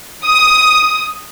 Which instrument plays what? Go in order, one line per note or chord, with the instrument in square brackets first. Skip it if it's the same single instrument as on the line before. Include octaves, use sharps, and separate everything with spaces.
[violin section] D#6